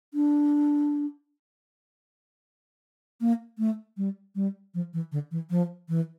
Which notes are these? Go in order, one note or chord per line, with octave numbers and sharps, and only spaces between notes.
D4
A#3
A3
G3
G3
F3
E3
D3
E3
F3
E3